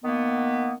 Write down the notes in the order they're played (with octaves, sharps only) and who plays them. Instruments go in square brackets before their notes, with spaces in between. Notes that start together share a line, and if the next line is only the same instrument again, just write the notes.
[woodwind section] D#3 A#3 B3